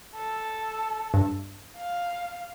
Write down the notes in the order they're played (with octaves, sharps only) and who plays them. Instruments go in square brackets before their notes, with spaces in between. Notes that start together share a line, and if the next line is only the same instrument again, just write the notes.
[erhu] A4
[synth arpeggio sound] G2
[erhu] F5